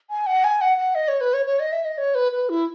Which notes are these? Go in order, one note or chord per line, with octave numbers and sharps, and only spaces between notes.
G#5
F#5
G#5
F#5
F#5
D#5
C#5
B4
C#5
C#5
D#5
E5
D#5
C#5
B4
B4
E4